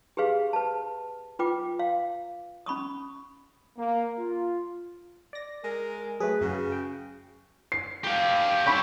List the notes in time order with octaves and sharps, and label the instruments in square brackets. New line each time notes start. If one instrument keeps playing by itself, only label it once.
[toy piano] G4 G#4 B4 F5
B4 A5
F4 B4 G5 D6
F5
C#4 B5 C#6 D#6
[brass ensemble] A#3
F4
[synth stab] D5 A#6
[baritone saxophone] G#3 [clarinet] A#4
[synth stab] F#3 A3 [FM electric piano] G#4 [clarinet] B4
[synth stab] F#2 F#3 [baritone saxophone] C#3 [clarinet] F#4
[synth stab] G5
[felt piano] C7
[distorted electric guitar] G4 F5
[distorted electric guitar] E4 G4 [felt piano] B5 C#6 G6